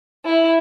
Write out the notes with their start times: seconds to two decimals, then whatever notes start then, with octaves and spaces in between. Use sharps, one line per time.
0.24 E4